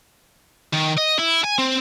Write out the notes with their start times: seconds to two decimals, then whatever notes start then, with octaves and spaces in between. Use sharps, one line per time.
0.73 D#3
0.98 D#5
1.19 E4
1.44 G#5
1.58 C4